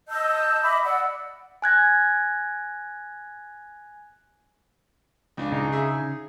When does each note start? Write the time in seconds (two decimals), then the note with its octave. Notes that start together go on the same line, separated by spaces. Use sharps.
0.09 D#5 A5 E6 G6
0.62 D#5 E5 B5 D6
0.84 D5 F#5 E6
1.62 G#5 F#6 G#6 A#6
5.37 C#2 D4 F4
5.52 C#3 D#4
5.72 G#4 E5